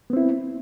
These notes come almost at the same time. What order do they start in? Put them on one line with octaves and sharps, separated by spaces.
B3 C4 E4